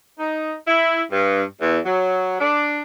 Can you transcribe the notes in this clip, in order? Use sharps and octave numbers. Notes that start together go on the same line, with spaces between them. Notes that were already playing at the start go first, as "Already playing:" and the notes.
D#4
E4
G2
E2
F#3
D4